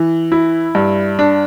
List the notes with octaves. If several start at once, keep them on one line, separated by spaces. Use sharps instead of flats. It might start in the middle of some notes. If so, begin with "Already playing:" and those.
Already playing: E3
E4
G2
D4